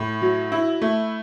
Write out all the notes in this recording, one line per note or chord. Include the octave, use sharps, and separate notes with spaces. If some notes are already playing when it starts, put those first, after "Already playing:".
Already playing: A2
F#3
E4
A3